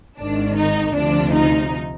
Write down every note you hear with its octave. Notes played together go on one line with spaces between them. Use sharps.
G#1 G#2 D#3 D4
D#4
D2 C3 F3 D4
D#4